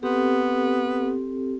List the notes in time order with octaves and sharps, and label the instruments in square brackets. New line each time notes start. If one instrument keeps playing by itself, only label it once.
[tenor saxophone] B3 [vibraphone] C4 G4 A4